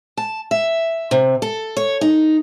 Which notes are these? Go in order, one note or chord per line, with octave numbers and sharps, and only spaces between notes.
A5
E5
C3
A4
C#5
D#4